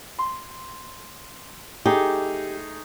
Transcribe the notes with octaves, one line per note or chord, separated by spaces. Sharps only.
C6
A3 D#4 G4 G#4